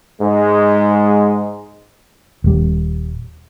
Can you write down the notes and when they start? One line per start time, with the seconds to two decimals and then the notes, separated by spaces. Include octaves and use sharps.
0.21 G#2 G#3
2.44 D#1 G3